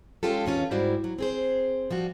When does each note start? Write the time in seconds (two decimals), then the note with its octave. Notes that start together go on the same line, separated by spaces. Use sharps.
0.23 G#3 C#4 F4 G4 A4
0.46 E2 D#3 C#4 F4
0.71 G#2 G3 E4 F#4 C5 D5
1.04 F#3
1.19 C4 G#4 C5
1.91 F3 G3 F#4